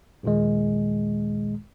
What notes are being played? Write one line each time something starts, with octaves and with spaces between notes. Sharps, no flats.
A#1 D#2 A#2 D#3 G#3